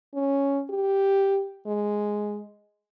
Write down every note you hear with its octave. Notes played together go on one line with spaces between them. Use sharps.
C#4
G4
G#3